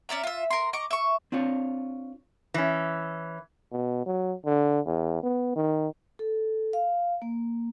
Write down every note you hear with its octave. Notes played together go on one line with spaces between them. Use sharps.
C#4 D5 E5 A#5
F4 E5
A#4 C6
D#5 A#5 C#6 D6
E5 C#6
C4 D4 F4 C#5
E3 C#4
B2
F#3
D3
E2
B3
D#3
A4
F5
A#3